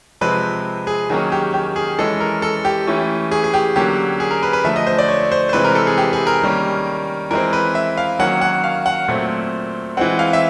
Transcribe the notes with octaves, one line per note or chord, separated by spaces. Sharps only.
C3 F3 G#3 C4 B4
G#4
D#3 F#3 A#3 C#4 G#4
G4
G4
G#4
E3 G#3 C#4 A4
A#4
A4
G4
E3 A3 C#4
G#4
G#4
G4
D3 F#3 A#3 C#4 G4
G#4
A#4
B4
B4
D3 F3 A3 E5
D#5
C5
D5
C#5
C5
C5
C3 E3 G#3 C4 B4
A#4
A4
G#4
G4
G#4
A#4
D#3 G3 A#3 C#4
E3 G#3 C4 A#4
B4
E5
F5
D#3 F#3 A#3 C#4 F#5
F#5
F5
F#5
A#2 F#3 A3 C4
E3 G#3 C4 F#5
F5
E5